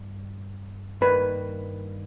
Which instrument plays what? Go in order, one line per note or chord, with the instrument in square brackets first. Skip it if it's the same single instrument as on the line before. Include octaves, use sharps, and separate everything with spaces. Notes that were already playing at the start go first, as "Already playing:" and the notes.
Already playing: [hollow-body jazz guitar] G2
[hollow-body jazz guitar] G2 D#3 A#3 [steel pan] B4